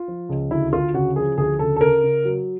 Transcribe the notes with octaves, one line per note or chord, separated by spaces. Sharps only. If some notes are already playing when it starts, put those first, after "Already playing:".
Already playing: F4
F3
C#2
D2 E4
D2 F4
C#3 F#4
F3 G#4
D2 G#4
C#3 A4
A4
C#3 A#4
C#3
F#3